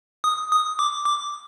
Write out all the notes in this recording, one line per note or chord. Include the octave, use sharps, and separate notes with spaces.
D#6
D#6
D6
D6